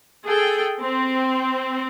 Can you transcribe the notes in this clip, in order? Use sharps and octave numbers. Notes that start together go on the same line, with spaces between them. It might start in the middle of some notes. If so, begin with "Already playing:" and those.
G#4 A4 G5
C4